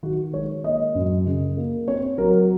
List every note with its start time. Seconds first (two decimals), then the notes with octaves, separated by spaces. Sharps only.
0.03 D#3 F#4
0.34 G#3 C#5
0.64 A#3 D#5
0.95 F#2
1.26 C#3
1.57 A#3
1.88 C4 C#5
2.18 F#3 A#4